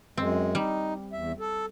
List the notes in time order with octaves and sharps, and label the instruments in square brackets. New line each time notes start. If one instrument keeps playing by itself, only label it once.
[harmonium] F#2 G#3 [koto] C4
[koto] G3 [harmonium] D#4
[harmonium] E2 E5
A4